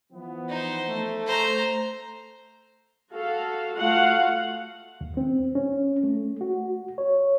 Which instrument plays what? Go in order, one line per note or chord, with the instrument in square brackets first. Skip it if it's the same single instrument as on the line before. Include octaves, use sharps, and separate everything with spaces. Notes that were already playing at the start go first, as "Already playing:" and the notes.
[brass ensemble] E3 F3 B3
[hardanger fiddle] D#4 C5
[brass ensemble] A3
[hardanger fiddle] C5 A#5
[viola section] F#4 A4 F5
A3 F4 F#4 F5 F#5
[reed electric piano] D#2
C4
C#4
A3
F#4
C#5